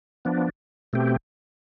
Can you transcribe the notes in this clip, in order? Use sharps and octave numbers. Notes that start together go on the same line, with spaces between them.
F3 B3 D4
B2 A3 C4 G4